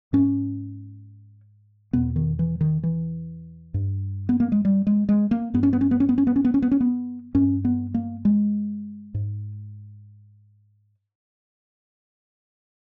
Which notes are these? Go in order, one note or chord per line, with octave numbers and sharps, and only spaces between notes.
G#2 C#4
E2 B2 B3
D#3
E3
D#3
E3
G2
B3
A#3
G#3
G3
G#3
G#3
A#3
G2 B3
C#4
B3
C#4
B3
C#4
B3
C#4
B3
C#4
B3
C#4
B3
C#4
B3
G2 C#4
B3
A#3
G#3
G#2